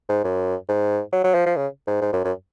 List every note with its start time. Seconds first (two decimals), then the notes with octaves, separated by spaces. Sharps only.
0.09 G#2
0.24 F#2
0.68 G#2
1.13 F#3
1.24 F#3
1.34 F3
1.46 F3
1.57 C#3
1.87 G#2
2.02 G#2
2.13 F#2
2.24 F#2